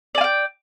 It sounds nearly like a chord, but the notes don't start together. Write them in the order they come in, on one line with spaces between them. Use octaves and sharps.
D5 G#5 F5 G5